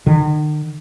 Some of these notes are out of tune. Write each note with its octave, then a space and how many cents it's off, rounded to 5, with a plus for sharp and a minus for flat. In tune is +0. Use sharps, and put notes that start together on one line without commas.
D#3 -45